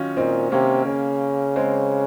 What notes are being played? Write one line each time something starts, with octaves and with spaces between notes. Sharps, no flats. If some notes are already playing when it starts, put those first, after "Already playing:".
Already playing: D#3 F#3 C#4 F4
A#2 C4 D#4
C3 A#3 C#4
C#3
G#3 C4